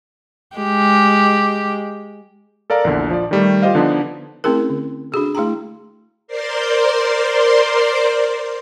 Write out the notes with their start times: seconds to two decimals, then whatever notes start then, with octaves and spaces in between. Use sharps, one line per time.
0.57 G#3 G4
2.70 A4 A#4 D5 F5 A#5
2.85 A#1 E2 D3
3.11 F3 D5
3.31 D#3 G3 A3
3.63 F4 G4 C5 D#5 F5
3.75 D3 F3 B3 D4 D#4
4.44 A3 C4 C#4 E4 G#4 A#4
4.70 D3
5.12 D4 F#4 G#4 A4
5.35 A3 E4 G#4 G5 A#5
6.27 A#4 C5 D5 C6